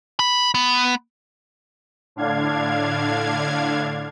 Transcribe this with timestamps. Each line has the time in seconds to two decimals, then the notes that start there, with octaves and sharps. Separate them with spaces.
0.19 B5
0.54 B3
2.16 A2 D3 D4 F5 G#6